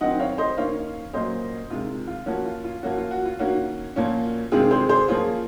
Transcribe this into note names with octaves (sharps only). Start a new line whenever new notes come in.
D#3 F#3 C4 D#5 F#5
C#5 F5
C5 D#5
D#3 A#3 C#4 C#5 F5
A#2 F#3 A#3 C#4 C5 D#5
C3 D#3 G#3 F4
F4
F3 A#3 C#4 F#4
F4
F4
F3 A#3 C#4 F#4
F4
F#4
F4
D#3 A#3 C#4 F#4
A#2 F3 A#3 C#4
C3 D#3 G#3 C4 F4 G#4
G#4 C5
G#4 C5
F3 A#3 C#4 F4 G#4